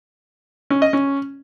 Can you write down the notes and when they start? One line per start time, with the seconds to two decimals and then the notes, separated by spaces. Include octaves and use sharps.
0.70 C#4
0.82 D#5
0.93 C#4